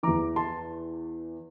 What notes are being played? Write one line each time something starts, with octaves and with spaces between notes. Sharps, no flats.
E2 E3 A#5 D6
A5 C6